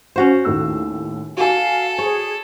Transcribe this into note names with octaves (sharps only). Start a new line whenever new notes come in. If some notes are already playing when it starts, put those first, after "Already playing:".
C#4 F#4 C5
D#2 A2 E6
F#4 A4 F5 G#5
G#4 C#5